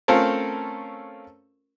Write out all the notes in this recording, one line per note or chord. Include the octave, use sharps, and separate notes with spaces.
A3 C4 C#4 F4 A4 A#4